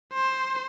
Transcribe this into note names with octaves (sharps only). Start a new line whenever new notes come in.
C5